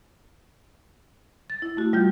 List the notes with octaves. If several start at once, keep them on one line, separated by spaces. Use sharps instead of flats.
A6
E4
A3 F#4
G3 F4 G6